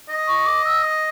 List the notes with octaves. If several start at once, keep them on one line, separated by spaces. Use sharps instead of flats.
D#5
C#6
D6
E6
D#6